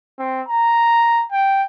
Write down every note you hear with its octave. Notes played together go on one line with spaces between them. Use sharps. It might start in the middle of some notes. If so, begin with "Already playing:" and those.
C4
A#5
G5